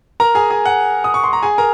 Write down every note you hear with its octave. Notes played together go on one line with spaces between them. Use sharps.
A#4 A#5
G#4 G#5
G#4 G#5
F#5
D#6
C#6
C6
A#5
G#4 G#5
A#4 A#5